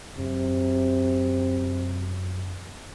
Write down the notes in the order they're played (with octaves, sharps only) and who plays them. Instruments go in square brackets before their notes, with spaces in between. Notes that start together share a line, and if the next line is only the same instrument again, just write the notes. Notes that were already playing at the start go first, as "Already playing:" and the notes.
[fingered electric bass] F#2 F#3 [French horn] C3